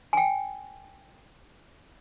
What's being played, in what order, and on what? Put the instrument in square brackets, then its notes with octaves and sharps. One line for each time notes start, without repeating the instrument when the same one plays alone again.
[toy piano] G5 G#5